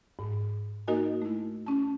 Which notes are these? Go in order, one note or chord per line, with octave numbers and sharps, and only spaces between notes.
G#2
A#3 D#4 F#4 A#4 D#5 G#5
A3 E4
C#4 A5